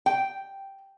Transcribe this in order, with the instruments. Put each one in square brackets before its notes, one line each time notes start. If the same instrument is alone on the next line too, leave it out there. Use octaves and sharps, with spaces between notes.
[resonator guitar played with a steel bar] G5